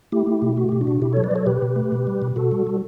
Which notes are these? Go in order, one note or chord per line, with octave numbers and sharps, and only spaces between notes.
A3 E4 G4
A3
B2
A3 F#4
B2 G4
D4 F#4
B2
B2 E4 G4
F#3 A4 C#5
B4 D5
F#3 A4 C#5
B2 G4 B4
B2
A3
B2
G3
B2
B2 F#4 A4
G3
G3